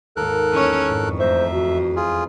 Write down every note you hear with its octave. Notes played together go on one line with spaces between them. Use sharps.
G#1 D#2 A4 A#4 F#6
E2 E3 C#4 C#5
F2 G#2 C#6
A3 C5 E5 A#5 A#6
F#4
F4 G#4